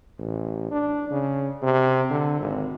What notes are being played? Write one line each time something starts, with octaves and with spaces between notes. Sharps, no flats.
A1
D4
C#3
C3
D3
G#1